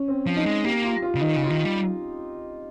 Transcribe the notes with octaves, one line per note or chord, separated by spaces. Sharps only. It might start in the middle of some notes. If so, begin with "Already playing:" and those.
Already playing: C#4
C4
F3
D#4
G#3
A#3 G4
F4
F4
C#3
D#3 D#4
C#3
F4
D#3 D#4
G3